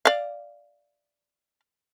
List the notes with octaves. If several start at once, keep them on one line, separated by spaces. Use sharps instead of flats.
D5 F5